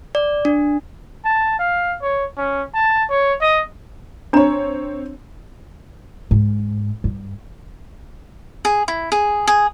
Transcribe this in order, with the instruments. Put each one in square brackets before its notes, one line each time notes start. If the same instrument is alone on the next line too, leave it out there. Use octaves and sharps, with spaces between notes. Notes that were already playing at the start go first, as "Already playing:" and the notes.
[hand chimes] D5
D4
[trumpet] A5
F5
C#5
C#4
A5
C#5
D#5
[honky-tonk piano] C4 C#5 [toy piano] D4 A#5
[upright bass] G#2
G2
[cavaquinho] G#4
E4
G#4
G#4